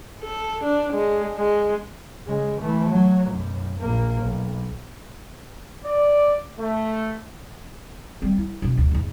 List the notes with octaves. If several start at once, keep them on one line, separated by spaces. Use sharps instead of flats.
A4
D4
G#3
G#3
C#3 G#3
E3 A3
F#3
B1 F#2
A#1 A#3
B1
D5
A3
G3 C4
E4
F#2 B2
D2
E2 G#2